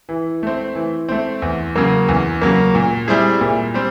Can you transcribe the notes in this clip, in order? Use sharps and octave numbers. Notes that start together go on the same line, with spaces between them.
E3
A3 C4
E3
A3 C4
E2
C#3 F#3 A#3
E2
C#3 F#3 A#3
A#2
G3 C4 E4 G#4
A#2
G3 C4